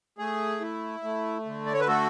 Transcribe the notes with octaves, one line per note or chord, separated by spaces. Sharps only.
A3 G#4
E4
A3
D3
D5
C#5
B4
A3 F#4 A4